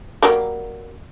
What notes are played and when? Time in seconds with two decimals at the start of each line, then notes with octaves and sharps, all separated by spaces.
0.22 F#3 G3 A#3